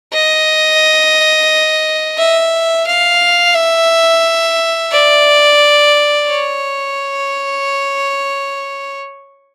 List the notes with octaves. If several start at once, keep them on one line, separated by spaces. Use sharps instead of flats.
D#5
E5
F5
E5
D5
C#5